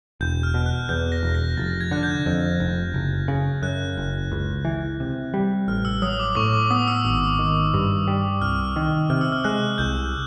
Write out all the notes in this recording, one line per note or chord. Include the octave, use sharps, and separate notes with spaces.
E1 G6
F6
B2
F#6
E2 G6
A#6
E1
A#6
F1 A6
G#6
D3 F#6
G6
F2
F1
F#1
C#3
F#2 F#6
F#1
C#2
E3
C3
G3
A1 F6
E6
F#3 D#6
D6
A2 C#6
D6
B3 D#6
E6
G#1
D#3
G2
G3
C2 F6
D#3
C3 F6
E6
F6
G#3 F#6
C2 G6